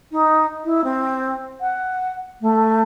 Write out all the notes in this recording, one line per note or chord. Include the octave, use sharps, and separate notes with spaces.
D#4
E4
C4
F#5
A3